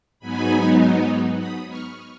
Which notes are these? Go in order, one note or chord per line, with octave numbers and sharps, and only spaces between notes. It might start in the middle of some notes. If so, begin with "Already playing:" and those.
G#2 F#3 B3 D#4 G#5 B5
B5 D#6
C#6 F6